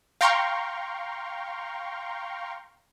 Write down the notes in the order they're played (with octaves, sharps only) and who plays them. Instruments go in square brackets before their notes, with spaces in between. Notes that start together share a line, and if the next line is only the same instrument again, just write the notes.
[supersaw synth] F5 G5 A#5 C6 C#6